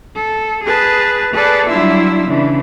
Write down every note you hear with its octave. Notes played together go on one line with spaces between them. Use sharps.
A4
G#4 B4 A5
G#4 A4 B4 D5 A5
F#3 G3 D4 E4 F4 E5
C#3 E3 D4